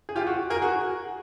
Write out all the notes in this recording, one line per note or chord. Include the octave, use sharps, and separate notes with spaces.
G#4
F4 G4
F#4
G#4 A#4
F#4 G#4